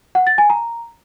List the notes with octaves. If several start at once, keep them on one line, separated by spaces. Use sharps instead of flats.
F#5
A6
G#5
A#5